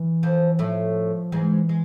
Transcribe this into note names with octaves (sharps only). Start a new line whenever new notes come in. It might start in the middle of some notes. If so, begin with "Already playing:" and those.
Already playing: E3
F2 F3
A2 F3 A3
G#2 E3 G#3
G#3